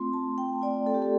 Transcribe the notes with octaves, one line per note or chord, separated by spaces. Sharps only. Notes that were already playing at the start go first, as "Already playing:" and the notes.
Already playing: A3 C4 F4 C6
A5
G5
A3 C4 F4 D5
A4
G4
A4